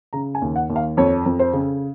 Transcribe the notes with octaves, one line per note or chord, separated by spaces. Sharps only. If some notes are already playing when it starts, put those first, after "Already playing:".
C#3 A#5
G#5
D#2
F#5
D#2
F5
F2 C#5
F2
C5
C#3